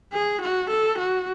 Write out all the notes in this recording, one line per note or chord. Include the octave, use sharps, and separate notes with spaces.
G#4
F#4
A4
F#4